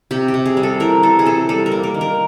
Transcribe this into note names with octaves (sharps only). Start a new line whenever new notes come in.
C3 G4
G4
C3
G#4
G3
A4
E3 A#4
E3 A4
G#4
C3 A4
G3 A4
A#4
A#3
A#4
D#3
A#4